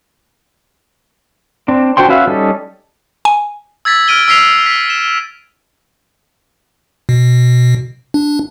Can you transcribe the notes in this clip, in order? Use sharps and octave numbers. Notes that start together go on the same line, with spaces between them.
C4 D4
D4 F#4 C5 G5 C6
C#4 F#4 B4 E5 F5
G3 C#4 D#4 A4
G#5
E6 G#6 A6 B6
F6 D7 D#7 G7
E6 B6 C7 F7
B6
E7
B2
D4